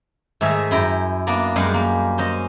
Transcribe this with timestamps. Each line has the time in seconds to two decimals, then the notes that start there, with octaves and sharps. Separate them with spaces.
0.41 G#2 D#3 A3 G#4 E5 G#5
0.71 F#2 E4 G5 A#5
1.27 A#3 B3 D4 D5 A#5
1.56 F#2 G3 G#3 F5 F#5
1.74 A#3
2.18 C#4 C5 D#5